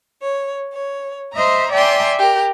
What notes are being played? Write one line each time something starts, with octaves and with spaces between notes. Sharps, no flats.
C#5
C#5
C5 D#5 E5 A#5
D5 E5 G5 G#5 A#5 C6
G4 A#4